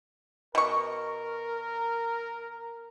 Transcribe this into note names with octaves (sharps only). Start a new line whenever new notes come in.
B2 A#4 C#6